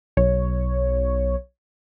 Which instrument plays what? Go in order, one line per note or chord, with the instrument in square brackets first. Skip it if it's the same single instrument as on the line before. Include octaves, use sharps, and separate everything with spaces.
[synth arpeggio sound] B1 C#5